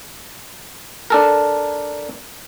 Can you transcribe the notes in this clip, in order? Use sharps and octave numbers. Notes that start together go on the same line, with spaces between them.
D4 A4 A#4